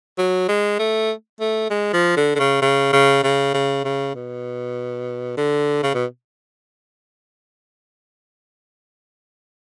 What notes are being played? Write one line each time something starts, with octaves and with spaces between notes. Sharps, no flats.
F#3
G#3
A3
A3
G#3
F3
D3
D3
C#3
C#3
C#3
C#3
C#3
C#3
B2
D3
C#3
B2